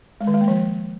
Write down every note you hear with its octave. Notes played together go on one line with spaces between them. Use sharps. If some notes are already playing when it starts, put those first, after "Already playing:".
G#3
D#3
G#3
A#3
F3